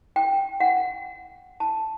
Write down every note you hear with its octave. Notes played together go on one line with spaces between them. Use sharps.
G5
F#5
A5